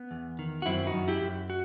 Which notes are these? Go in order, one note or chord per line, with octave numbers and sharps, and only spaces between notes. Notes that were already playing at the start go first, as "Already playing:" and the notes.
Already playing: B3
E2
D#3
F#4
F#2 C4 E4
D#4 F#4
F#2
E4 G4
F#2
F#4